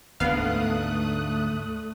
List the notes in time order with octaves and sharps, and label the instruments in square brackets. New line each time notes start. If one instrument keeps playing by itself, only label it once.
[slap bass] D2 G#2 D3 [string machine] A3 D#6 F#6 [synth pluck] B3 F5